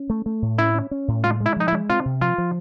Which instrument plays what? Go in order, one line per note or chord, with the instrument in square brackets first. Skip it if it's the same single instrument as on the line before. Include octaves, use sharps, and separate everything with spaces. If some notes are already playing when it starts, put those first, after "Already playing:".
Already playing: [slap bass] C#4
A3
A3
A2
[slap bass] C#4 [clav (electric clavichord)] E4
[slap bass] C#4
C#4
A2
[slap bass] G#3 [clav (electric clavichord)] F4
[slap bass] G#3
[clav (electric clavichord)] E4
[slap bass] F3 [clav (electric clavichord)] D#4
[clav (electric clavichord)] E4
[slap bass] G#3
[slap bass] C4 [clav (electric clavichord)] F4
[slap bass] C3
[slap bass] F3 [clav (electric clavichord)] F4
[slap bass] F3